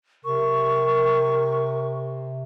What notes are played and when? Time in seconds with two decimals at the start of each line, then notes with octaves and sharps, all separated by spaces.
0.25 C3 A#4 C#6